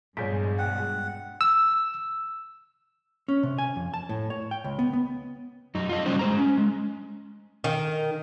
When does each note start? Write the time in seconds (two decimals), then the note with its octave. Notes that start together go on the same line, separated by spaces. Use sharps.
0.17 A#1 G2 B2 G#3 G#4 C#5 G6 B6
0.59 F#5 G5
1.41 E6
3.28 C#4
3.43 C3
3.58 G#5
3.76 F2
3.94 A5
4.09 A2
4.30 C#5
4.51 G5
4.64 C#2
4.79 B3
4.93 B3
5.75 F#2 D#4
5.89 F4 D#5
6.06 C#3 G3 C#4 D#4 F#4 C5
6.19 G#3 C5 A#5
6.38 C#4
6.58 G#3
7.64 D#3